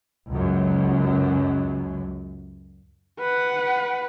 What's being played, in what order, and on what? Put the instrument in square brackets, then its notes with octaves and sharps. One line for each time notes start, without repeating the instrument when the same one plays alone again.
[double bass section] C#2 F#2
[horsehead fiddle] B4 F#5